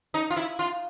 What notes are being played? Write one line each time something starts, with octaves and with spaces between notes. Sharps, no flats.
D#4
F4
E4
F4